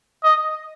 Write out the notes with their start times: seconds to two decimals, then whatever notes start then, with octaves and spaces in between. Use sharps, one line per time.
0.24 D#5